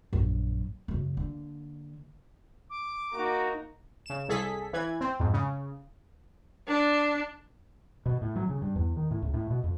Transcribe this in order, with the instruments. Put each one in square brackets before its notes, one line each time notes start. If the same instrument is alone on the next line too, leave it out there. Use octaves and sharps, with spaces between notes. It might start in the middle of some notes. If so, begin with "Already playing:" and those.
[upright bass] A#1 F#2
F#2 C#3
D3 A#3
[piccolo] D6
[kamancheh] A#3 D#4 [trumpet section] F#4 A#5
[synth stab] C#3 E7
C2 G#4 A4 B6
E3 B4 G#6
C4
F2 G#2
C#3
[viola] D4
[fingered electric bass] B2
A2
F#3
C#3
G2
E2
D#3
A2
C#2
A2
B2
F2